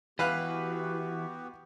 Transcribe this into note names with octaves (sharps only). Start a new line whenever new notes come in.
E3 B3 F#4 G4 B4 F5 F#6